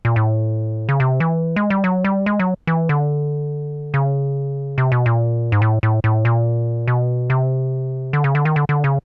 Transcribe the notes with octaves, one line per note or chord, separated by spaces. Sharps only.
A#2
A2
C#3
C3
E3
G#3
G3
F#3
G3
G#3
F#3
E3
D3
C#3
C3
B2
A#2
G#2
A2
A2
A2
A#2
B2
C3
D3
C#3
D3
D#3
D3
D3
C#3